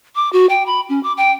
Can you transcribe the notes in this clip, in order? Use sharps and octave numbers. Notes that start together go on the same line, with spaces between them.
D6
F#4
G5
B5
C#4
D6
G5